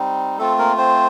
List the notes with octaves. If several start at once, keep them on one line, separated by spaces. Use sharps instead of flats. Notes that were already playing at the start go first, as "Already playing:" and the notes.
Already playing: G3 C4 D#4
A3 C4 F4 A4
A#3 A#4
C4 C5